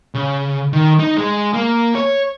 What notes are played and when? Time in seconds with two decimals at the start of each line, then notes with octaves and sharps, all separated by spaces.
0.14 C#3
0.73 D#3
0.99 D#4
1.17 G#3
1.54 A#3
1.95 C#5